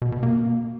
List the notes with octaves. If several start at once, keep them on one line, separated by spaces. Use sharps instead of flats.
B2
B2
A#3